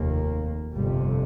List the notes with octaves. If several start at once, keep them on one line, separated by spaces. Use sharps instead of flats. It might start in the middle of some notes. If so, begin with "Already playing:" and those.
Already playing: F1 D#2 A#3
G1 F2 C3 G3